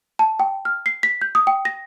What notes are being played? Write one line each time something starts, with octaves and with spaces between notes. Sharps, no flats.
A5
G5
F6
C7
B6
G6
D#6
G5
A#6